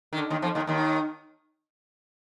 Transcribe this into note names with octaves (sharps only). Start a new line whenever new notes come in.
D#3
D3
D#2 D#3
F2 F3
D#2 D#3
D#2 D#3